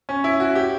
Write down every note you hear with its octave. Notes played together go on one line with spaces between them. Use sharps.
C#4
E4
F#4
G4